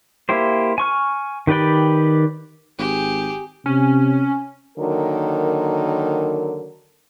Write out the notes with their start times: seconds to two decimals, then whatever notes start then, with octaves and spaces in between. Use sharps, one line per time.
0.29 A#3 E4 G4 C5
0.78 G#5 C#6 F6
1.47 D#3 G4 B4 D5 G5
2.78 G#1 G4 G#4
3.66 C3 C#4
4.78 D3 D#3 F#3 A#3 A#4